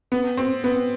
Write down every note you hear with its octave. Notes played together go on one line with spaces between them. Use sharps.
B3
C4
B3